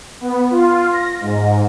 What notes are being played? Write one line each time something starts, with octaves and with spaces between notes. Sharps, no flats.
B3
F4
A#6
G#2